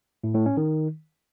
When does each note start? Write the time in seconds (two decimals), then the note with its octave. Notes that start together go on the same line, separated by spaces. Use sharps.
0.24 A2
0.35 A2
0.46 C#4
0.57 D#3